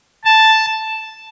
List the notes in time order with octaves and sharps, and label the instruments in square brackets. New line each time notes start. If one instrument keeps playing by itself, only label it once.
[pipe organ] A5